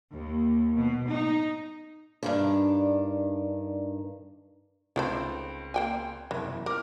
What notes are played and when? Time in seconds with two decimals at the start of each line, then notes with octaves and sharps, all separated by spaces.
0.12 D#2
0.76 B2
1.08 D#4
2.23 G2 D#3 D4
4.96 C#2 D#3 A3 C4 A4
5.74 A#3 G5 G#5
6.31 F#1 C2 E3
6.48 E2
6.66 A#4 D6 F6